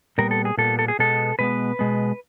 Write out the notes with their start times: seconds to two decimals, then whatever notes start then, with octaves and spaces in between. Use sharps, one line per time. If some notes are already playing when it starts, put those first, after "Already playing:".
0.18 A#2 G3 B3 A#4
0.31 A4
0.45 G#4
0.57 A#2 G3 B3 A4
0.79 A4
0.88 G#4
0.99 B2 G#3 B3 A4
1.39 B2 G#3 B3 B4
1.79 B2 G#3 B3